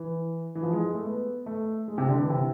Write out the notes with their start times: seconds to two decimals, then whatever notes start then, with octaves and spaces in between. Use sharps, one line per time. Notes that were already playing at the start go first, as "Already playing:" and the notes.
Already playing: E3
0.55 E3
0.63 F3
0.73 G#3
0.84 G#3
0.95 A3
1.05 B3
1.46 A3
1.88 G#3
1.98 C3
2.08 D3
2.19 E3
2.30 C3